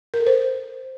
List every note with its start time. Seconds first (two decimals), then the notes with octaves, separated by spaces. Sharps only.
0.14 A#4
0.20 A4
0.27 C5